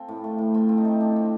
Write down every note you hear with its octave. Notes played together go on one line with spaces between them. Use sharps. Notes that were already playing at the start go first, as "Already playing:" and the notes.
Already playing: C4 F4 A4 C5
A2
A3
A2
C4 F4
C4
D#4
A3
C4 D4
C4